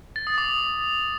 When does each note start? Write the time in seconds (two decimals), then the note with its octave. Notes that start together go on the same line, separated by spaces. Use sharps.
0.16 A6
0.27 D#6
0.38 D6